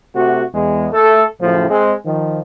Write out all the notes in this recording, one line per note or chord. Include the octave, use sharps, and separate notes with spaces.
C3 A3 F#4
E2 G#3
A3 A4
F#2 A2 C#3 F3
G#3 C4
D#3 F3